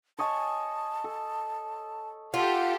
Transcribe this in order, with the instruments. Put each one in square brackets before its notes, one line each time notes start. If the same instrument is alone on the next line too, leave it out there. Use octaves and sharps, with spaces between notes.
[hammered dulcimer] C#5 D#5 G#5 [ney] A5
[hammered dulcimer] A4
[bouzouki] F4 [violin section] G4 A4 F5 [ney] F#5